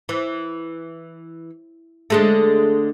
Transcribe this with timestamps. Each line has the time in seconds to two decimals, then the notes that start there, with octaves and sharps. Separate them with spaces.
0.09 E3
2.10 D3 G#3 A3